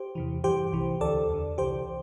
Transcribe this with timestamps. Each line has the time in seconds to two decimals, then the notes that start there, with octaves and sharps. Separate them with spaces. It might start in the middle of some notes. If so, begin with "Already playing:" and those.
Already playing: G4 C5
0.15 E2 C3 E3
0.44 G2 E3 G4 C5
0.73 C2 C3 E3
1.01 D2 D3 A4 D5
1.30 E2 D3
1.58 C2 C3 E3 G4 C5